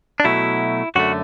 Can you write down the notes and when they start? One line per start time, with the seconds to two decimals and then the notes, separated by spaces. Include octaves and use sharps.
0.20 D4
0.24 B2 F#3 A3 E4
0.95 F#2 D3 A3 F#4